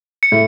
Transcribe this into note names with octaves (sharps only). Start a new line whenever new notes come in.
C#7
A2